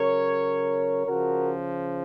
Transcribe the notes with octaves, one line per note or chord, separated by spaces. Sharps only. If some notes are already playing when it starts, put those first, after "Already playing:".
Already playing: C#3 F#3 A#4 C#5
C#3 F3 F#4 A#4